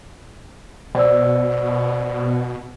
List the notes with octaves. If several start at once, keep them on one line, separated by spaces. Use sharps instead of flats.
B2 C5 D5 E6